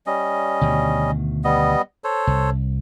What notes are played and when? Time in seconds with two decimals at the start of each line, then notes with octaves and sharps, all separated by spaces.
0.06 G3 C#4 D#5
0.61 D2 B2 D#3
1.44 G3 B3 D#5
2.04 A4 C5 C#5
2.27 C2